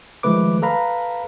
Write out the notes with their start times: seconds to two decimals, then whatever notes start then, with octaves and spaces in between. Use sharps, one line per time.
0.23 D#3 F3 G#3 A3 B4 D6
0.62 A4 B4 F5 A#5 B5